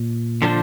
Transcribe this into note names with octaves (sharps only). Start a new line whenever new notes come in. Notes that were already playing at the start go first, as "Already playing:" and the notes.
Already playing: A#2
D3 F3 D4 F4 C5